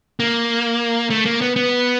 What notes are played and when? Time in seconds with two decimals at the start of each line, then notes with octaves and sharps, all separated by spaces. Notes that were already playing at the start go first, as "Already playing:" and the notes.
0.20 A#3
1.10 A3
1.25 A#3
1.41 B3
1.56 B3